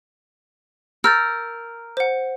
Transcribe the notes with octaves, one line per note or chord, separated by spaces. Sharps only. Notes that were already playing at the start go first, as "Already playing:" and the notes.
A#4 E6 G6 A6
C5 F#5